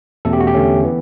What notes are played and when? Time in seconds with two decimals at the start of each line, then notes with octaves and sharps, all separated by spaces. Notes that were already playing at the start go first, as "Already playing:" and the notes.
0.25 E2 B2 A3 C#4 A4
0.33 G4
0.40 F#4
0.47 G4
0.54 E2 D3 A3 C#4
0.84 E3 B3